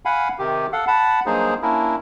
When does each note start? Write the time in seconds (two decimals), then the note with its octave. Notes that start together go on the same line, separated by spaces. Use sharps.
0.05 F5 F#5 G#5 B5
0.39 C3 D#3 G4
0.73 A4 F5 F#5
0.88 F#5 A5 B5
1.26 G2 F#3 A#3 D#4 G#4 C5
1.62 A#3 C#4 D4 E4 A#4